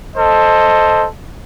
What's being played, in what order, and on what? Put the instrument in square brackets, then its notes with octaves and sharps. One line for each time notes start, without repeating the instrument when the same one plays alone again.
[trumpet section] A4 C5 D#5